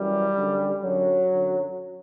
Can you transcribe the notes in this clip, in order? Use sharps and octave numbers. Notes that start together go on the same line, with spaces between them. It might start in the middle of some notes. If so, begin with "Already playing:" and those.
Already playing: F#2 E3 G3
F#2 D3
F#2 D3 F#3
F#2 D3